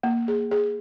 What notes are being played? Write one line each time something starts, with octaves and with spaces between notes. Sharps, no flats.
A#3
G#4
G#4